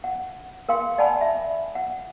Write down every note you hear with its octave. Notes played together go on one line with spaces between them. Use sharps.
F#5
A#4 F5 G5 C6
D5 F#5 G#5 A5 B5
E5
F#5